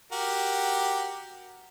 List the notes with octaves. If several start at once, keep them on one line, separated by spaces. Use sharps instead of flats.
F#4 G4 A#4